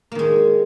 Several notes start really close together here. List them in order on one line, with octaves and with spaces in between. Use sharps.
A#3 D#3 G#3